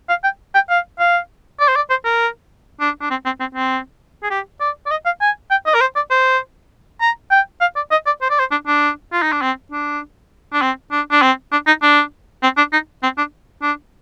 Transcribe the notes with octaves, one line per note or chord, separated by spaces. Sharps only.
F5
G5
G5
F5
F5
D5
C5
D5
C5
A#4
D4
D4
C4
C4
C4
C4
G#4
G4
D5
D5
D#5
F5
G#5
G5
D#5
A#4
C5
D5
C5
A#5
G5
F5
D5
D#5
D5
C5
D5
C5
D4
D4
F4
D#4
D4
C4
D4
D4
C4
D4
D4
C4
D4
D#4
D4
C4
D4
D#4
C4
D4
D4